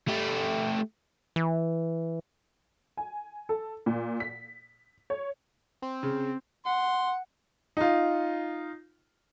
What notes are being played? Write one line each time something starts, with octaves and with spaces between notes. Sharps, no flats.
A3 G4
E3
G#5
A4
A#2
B6
C#5
C4
C#3
F#5 C6
D#4 F4